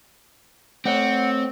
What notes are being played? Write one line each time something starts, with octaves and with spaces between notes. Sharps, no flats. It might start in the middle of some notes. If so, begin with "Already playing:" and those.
A3 C4 C#5 F#5